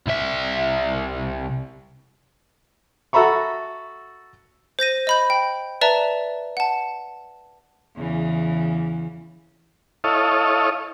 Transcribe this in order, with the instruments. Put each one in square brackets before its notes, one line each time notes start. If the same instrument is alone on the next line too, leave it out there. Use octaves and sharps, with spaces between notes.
[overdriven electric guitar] C2 E5
[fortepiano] F#4 A4 E5 A#5 B5 C#6
[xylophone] C5 G6 A#6 D#7
D#5 B5 G6
G5
B4 D5 E5 A5 A#5
F#5 A5
[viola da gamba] E2 C#3 E3
[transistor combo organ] E4 A4 C#5 D#5 F5